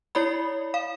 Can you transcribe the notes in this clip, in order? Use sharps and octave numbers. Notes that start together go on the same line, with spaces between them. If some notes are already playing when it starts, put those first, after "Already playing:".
E4 C#5 D5 B5
F5